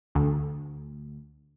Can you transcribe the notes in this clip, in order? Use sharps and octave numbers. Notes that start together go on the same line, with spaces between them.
D2